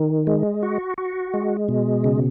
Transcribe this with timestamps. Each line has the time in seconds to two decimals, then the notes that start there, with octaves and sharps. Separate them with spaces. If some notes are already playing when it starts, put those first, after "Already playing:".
Already playing: D#3
0.27 G#3
0.63 F#4
0.98 F#4
1.34 G#3
1.69 B2
2.04 C#3